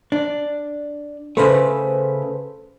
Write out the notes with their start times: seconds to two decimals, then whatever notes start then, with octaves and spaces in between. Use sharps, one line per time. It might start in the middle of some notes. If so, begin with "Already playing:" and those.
0.12 D4
1.37 C#3 A3 A4 B4 C5